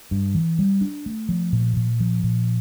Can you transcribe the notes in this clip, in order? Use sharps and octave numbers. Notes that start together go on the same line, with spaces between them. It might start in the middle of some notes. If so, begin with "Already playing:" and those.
G2
E3
G3
D4
A3
F3
A#2
A#2
F3
A#2